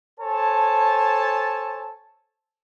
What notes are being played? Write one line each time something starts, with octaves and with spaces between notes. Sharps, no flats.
A4 C5 C#5 G#5 A5